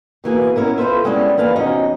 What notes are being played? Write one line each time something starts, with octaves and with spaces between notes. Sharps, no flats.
B2 E3 A#3 G#4
B3 C#4 E4 A#4
F4 A4 B4 C5 E5
G3 G#3 B3 C#4 D4 E4
E3 A#3 B4 F5 A5
E2 C3 F#3 C#4 D#4 D#5